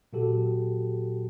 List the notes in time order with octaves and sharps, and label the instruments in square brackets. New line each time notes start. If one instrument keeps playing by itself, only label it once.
[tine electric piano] A#2 F#3 F#4 G4 A4